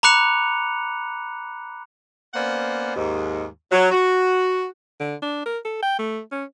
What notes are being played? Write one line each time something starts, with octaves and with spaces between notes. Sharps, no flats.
A#5 B5 D6 F#6 C#7 F7
A#3 B3 C#4 C5 D5 F#5
D#2 G#2
F#3
F#4
D3
D4
A#4
A4
G5
A3
C#4